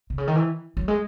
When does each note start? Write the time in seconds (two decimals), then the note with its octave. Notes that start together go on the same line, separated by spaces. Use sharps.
0.10 C3
0.18 C#3
0.27 D#3
0.35 E3
0.77 F#3
0.88 G#3